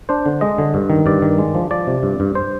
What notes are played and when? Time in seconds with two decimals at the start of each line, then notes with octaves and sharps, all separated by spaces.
0.09 D4 C5
0.26 D3
0.41 G#3 D#5
0.58 D3
0.74 G2
0.90 D#3
1.06 G2 D5
1.22 D#3
1.38 G#3
1.55 F3
1.71 F3 D5
1.87 C3
2.03 G2
2.20 G2
2.35 C5